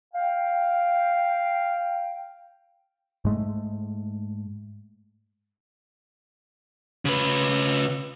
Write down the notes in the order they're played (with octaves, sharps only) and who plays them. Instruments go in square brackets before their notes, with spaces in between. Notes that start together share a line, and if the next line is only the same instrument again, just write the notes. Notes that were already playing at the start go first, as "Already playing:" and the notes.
[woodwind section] F5 G5
[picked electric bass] G#2 G#3 A3
[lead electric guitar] C#3 B4